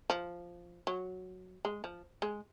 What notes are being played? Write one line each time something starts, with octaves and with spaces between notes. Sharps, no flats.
F3
F#3
G#3
F3
G#3